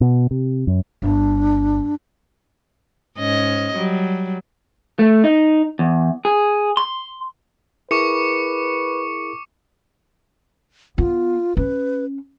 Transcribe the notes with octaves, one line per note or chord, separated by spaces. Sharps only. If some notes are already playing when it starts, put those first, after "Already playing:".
B2
C3
F#2
G1 D4
G#2 C#4 D#5
F#3 G3
A3
D#4
E2
G#4
C6
E4 G#4 A#4 B4 C#6 D6 C#7
B3 F4
C#4 B4